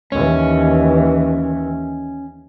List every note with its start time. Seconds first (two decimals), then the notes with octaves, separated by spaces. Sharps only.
0.12 D#2 E3 C#4